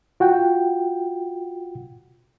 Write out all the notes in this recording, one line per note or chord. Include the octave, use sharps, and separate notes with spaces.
F4 F#4 F#5 G5